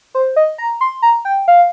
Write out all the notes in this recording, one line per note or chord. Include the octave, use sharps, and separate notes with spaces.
C5
D#5
A#5
C6
A#5
G5
F5